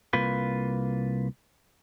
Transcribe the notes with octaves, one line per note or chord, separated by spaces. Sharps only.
C2 A#3 F4 B4